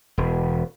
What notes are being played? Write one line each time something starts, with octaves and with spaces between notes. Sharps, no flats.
E1